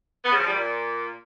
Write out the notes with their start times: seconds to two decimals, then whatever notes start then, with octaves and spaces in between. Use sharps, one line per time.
0.24 B3
0.32 C#3
0.39 F3
0.47 G3
0.55 A#2